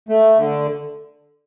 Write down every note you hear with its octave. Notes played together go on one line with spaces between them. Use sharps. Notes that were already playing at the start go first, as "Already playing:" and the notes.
A3
D3